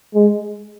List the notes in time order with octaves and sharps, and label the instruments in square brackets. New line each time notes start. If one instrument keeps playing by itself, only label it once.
[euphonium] G#3